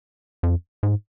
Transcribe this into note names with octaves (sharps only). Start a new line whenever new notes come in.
F2
G#2